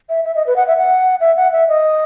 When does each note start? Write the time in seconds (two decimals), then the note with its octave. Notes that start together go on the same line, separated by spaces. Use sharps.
0.09 E5
0.24 E5
0.36 D#5
0.47 B4
0.56 F#5
0.67 E5
0.77 F#5
1.21 E5
1.36 F#5
1.52 E5
1.68 D#5